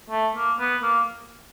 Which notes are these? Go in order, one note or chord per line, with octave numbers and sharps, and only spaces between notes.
A3
A#3
B3
A#3